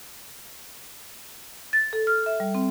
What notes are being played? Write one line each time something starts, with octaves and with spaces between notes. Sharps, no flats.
A6
A4
F6
E5
G3
C4